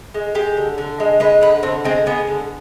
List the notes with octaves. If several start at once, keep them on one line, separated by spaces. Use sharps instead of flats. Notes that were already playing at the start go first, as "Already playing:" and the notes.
G#3
G#3 G4
D3
D3
G#3
G#3 B4
D3 B4
D3 C4
G#3 C4
G#3 B3
D3